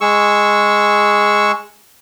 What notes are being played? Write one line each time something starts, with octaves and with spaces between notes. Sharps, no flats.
G#3 G#4 C#6 E6